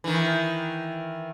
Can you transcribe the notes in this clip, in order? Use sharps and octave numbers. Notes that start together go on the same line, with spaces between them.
D#3 E3